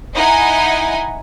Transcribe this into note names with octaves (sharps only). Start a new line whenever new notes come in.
D#4 E4 D#5 F#5 G#5